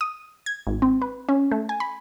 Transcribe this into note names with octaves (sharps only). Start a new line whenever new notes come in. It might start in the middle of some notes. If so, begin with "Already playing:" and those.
D#6
G#6
G#1
C4
B4
C#4
A3
G#5
B5